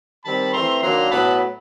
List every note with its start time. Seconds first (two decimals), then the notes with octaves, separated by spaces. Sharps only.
0.23 D#3 G3 C4 A5 B5
0.52 E3 A3 C4 A#5 C6
0.82 D#3 F#3 A#3 D4 A#5 C6
1.11 A2 F#3 B3 A5 B5